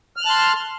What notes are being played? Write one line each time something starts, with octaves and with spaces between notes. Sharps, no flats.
A5 C6 F6 F#6